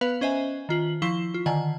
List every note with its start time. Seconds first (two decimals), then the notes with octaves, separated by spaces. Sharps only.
0.01 B3 B4 F5
0.21 C#4 C5 D#5 E5 G#5
0.69 D#3 F4 F#7
1.02 F3 E4 C#6 C7 E7 G7
1.34 F4
1.46 D3 D#3 F#5 G#5